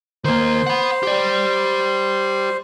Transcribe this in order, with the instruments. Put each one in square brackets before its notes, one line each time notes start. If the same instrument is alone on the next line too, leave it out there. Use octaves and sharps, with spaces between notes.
[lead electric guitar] D#3 A#3 [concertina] C5
[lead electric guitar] F#5 B5
G4 D5